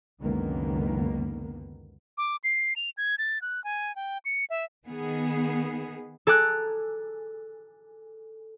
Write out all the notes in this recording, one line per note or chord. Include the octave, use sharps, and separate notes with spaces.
C#2 F#2 D3 D#3 A#3 B3
D6
C7
F7
G#6
A6
F#6
G#5
G5
C#7
E5
D#3 B3 G#4
A4 G#5 A#5 D6 F#6